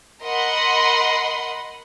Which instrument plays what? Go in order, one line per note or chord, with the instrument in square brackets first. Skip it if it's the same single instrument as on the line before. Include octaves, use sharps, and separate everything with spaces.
[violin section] A#4 D#5 F#5 B5 C6